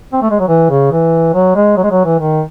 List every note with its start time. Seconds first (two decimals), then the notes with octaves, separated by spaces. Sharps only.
0.13 C4
0.22 A3
0.31 G#3
0.40 F#3
0.48 E3
0.70 C#3
0.92 E3
1.34 F#3
1.55 G#3
1.77 F#3
1.84 G#3
1.91 F#3
2.05 E3
2.19 D#3